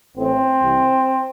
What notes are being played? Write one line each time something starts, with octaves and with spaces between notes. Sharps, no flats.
A1 A2 E3 C4
C2 C3 E3